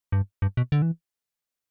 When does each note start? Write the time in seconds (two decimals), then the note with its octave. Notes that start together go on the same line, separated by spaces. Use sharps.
0.12 G2
0.42 G2
0.57 B2
0.72 D3
0.82 E3